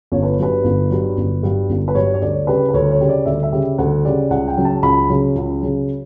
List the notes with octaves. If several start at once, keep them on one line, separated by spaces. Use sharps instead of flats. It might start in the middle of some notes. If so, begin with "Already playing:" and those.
G1 C#5
B4
G2 F#3 B4
G1
G2 F#3
G1
G2 F#3
G1
B4
G2 F#3 C#5
C#5
D2 D5
C#3 G3 B4
B4
D2 C#5
C#5
C#3 G3
D5
D2 E5
E5
C#3 G3
D2 F#5
C#3 G3 D5
C#2 F#5
G5
C#3 F#3
A5
C#2 B5
C#3 F#3
C#2
C#3 F#3